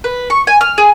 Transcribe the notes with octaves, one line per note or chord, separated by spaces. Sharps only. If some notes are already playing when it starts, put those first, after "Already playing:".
B4
C#6
G#5
F6
G#4